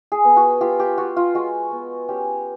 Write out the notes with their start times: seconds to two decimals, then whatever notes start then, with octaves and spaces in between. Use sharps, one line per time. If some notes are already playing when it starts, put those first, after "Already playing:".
0.12 G#4
0.24 B3
0.37 F#4
0.61 F4 G4
0.80 G4
0.98 F4 F#4
1.16 F4
1.34 G#3 F#4
1.71 B3
2.09 C#4 G4